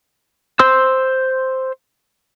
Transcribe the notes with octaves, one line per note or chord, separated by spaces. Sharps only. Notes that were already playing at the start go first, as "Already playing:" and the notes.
C5 C6 E6